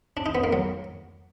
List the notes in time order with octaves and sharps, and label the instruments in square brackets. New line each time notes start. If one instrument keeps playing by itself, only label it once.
[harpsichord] D4
D#4
B3
A#3
F#3